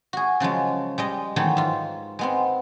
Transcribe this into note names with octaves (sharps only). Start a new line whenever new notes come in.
F#4 G#4
C#3 F3 F#3 G#3
G3 G#3 D#5
D#3 E3 F#3 G#3 A3
G#2 F4
G#3 B3 C4